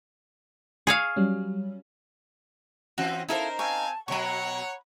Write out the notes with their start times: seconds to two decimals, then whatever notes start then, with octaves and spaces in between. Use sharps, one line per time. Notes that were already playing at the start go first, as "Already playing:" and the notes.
0.87 G#4 C#5 F5
1.16 F#3 G3 C#4
2.98 E3 C4 C#4 F#4
3.29 D#4 E4 A4 A#4 C5 F5
3.59 C4 F5 G#5 A5 C#6
4.08 B2 F#3 C#5 F#5 A#5 B5 C#6